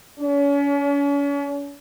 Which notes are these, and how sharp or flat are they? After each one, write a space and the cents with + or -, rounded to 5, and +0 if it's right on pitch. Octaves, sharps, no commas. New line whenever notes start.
C#4 +40